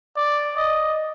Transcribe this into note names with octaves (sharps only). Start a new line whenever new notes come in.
D5
D#5